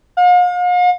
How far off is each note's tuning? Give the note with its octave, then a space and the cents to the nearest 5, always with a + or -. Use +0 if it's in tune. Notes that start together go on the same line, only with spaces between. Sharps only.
F5 +45